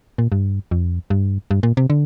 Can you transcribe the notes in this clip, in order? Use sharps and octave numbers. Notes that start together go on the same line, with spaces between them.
A#2
G2
F2
G2
G2
A#2
C3
D3